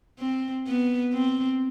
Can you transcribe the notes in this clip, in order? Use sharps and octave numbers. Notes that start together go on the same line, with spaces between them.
C4
B3
C4